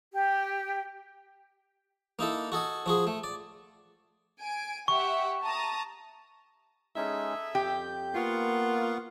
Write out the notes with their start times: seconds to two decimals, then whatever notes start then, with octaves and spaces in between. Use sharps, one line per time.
0.13 G4
2.19 A#3 D#4 E4 A4
2.52 F#4 A4 D#5 G#5
2.86 F3 F#4 G#4
3.07 A3
3.24 D5
4.42 G#5 D7
4.88 G4 E5 F#5 C#6
5.42 A5 A#5 D#6
6.96 G#3 C#4 D#4 G#4 A4 E5
7.55 F2 G4 G6
8.15 A#3 B3 F4 F#5 C#6